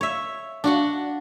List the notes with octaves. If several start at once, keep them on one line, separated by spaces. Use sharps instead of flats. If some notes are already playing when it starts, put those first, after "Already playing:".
C#5 E5
D4 F#4 F#5